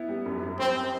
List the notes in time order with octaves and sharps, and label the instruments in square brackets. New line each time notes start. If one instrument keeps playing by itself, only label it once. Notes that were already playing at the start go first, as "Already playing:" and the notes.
Already playing: [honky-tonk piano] B3 E4
G3
F#2
F#2
[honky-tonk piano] F#2 [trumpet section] C4